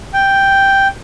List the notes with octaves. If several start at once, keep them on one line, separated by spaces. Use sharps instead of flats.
G5